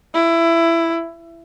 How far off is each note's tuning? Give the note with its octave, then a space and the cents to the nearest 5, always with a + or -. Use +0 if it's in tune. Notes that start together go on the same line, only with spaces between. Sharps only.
E4 +15